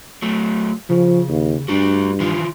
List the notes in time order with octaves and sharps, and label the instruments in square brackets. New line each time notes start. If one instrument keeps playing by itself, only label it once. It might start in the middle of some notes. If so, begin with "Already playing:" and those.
[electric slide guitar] F#3 A3
[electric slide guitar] C#3 [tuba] F3
[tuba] D#2
[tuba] G2 [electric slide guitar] D4 F#4
[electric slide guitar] D#3 E3 F4